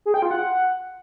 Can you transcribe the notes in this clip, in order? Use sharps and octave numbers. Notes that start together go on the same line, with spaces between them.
G#4
G5
F4
F#5